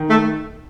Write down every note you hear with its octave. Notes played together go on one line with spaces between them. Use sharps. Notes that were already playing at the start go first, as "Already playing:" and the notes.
Already playing: D#3
A3